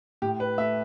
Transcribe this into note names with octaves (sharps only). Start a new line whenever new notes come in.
A2 G4
B4
A3 E5